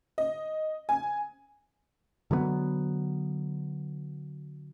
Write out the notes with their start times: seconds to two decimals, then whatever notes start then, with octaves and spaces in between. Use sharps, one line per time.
0.18 D#5
0.89 G#5
2.31 D3 F#3 G3 B3